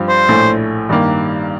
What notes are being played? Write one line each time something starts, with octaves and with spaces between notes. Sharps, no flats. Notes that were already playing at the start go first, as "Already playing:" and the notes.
Already playing: G2 F3 C4 F4
C5
A#1 A2 A3
G2 D#3 A#3